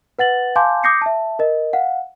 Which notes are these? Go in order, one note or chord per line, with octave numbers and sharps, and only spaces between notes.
B4 F#5 A6 F#7
F5 G#5 A5 C6 D6 G6
D6 D#6 G6 A#6 C7 C#7
E5 A5
A#4 D#5
F5 F#5